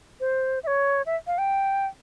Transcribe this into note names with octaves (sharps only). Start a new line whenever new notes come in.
C5
E5
C#5
E5
F5
G5